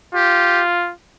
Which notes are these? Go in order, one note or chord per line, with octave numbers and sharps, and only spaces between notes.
F4 G4